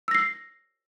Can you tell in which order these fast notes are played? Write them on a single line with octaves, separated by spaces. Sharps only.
E6 A#6 C7